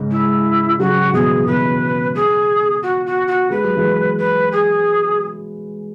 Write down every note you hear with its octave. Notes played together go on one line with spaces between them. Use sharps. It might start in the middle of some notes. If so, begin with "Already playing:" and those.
Already playing: G#2 C#3
E4
C#3 F#3 F#4
B2 E3 G#4
B2 E3 B4
G#4
F#4
F#4
F#4
G#3 B4
F#3
E3 G#3
B4
G#4